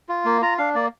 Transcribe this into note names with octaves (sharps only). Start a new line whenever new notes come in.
F4
A#3
F4 A#5
D4 F5
A#3 D5